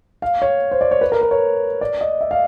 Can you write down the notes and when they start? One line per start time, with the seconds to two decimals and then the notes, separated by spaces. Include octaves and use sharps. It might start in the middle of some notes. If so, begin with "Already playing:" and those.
0.22 F5
0.42 C#5
0.71 C5
0.81 D5
0.91 C#5
1.01 B4
1.12 A#4
1.21 B4
1.31 C#5
1.81 D5
2.01 D#5
2.21 E5
2.31 F5